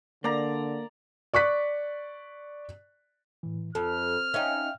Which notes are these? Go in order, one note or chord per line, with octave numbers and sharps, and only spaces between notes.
D3 A#3 D5 A#5
D5 C#6 F#6 B6
A2 E3
F2 A4 F6
C#4 D#4 E5 F5 G5